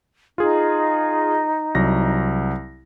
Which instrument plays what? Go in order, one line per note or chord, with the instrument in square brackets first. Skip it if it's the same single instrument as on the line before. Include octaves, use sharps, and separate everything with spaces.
[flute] D#4 [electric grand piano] F4 G#4
[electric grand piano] C2 F#3 A#6